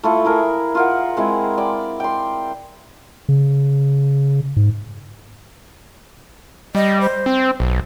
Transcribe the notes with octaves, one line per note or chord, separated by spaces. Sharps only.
A3 E4 F4 A4
E4 G#4 A#4
F4 A#4 F#5
G#3 C4 E4
D5 G5
G5 C6
C#3
G#2
G3 D#5
C5
C4
B1